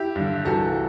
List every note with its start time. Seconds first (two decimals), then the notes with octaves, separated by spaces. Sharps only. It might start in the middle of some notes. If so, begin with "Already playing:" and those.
Already playing: E4 G4
0.16 G2 D3
0.45 C2 C3 E3 F#4 A4